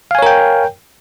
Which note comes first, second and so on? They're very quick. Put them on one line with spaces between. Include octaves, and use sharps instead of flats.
F5 G#5 C#5 A#4 G5